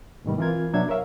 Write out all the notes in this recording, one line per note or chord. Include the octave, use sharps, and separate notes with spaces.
G#2 B2 D#3 G3
E3 C4 F4 A#4 G#6
B2 F#3 D4 E5 G#6
A#4 C#5 E5 F5